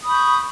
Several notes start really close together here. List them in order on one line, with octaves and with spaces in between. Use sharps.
D#6 B5 C#6 G6